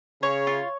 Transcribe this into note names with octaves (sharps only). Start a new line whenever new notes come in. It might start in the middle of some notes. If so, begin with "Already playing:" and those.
C#3 C#5
F4